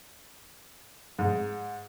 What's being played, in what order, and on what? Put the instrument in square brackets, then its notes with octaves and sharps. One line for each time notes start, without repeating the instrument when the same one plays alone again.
[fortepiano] G#2